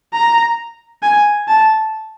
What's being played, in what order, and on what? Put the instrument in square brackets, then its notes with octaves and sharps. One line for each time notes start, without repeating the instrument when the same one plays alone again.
[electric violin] A#5
G#5
A5